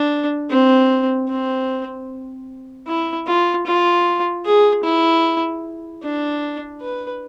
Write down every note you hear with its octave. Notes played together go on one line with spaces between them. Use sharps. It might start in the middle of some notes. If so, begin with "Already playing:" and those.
Already playing: D4
C4
C4
E4
F4
F4
G#4
E4
D4
B4